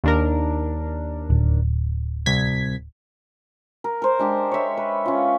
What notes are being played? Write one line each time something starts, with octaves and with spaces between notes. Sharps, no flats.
D#2 D4 A#4
D1
C2 G#6 B6
A#4
A#4 C5
G#3 D4 G4
C#5 E5
B4
C#4 F4